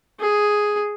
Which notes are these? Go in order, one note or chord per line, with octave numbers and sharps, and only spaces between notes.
G#4